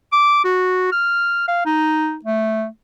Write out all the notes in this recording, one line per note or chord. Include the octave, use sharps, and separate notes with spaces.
D6
F#4
F6
F5
D#4
A3